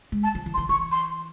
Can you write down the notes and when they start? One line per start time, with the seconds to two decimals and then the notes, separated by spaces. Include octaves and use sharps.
0.12 G#3
0.23 A5
0.35 F3
0.46 E3
0.54 C6
0.58 E3
0.69 E3 C#6
0.91 C6